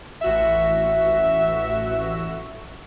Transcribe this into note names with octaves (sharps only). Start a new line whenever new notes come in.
A1 F#4 E5 E6